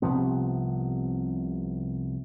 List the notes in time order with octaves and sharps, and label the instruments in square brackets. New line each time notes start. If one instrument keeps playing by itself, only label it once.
[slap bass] C2 C3 F3 B3